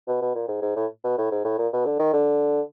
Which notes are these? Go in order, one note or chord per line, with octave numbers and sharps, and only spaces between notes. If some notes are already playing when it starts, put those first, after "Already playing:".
B2
B2
A#2
G#2
G#2
A2
B2
A2
G#2
A2
A#2
B2
D3
D#3
D3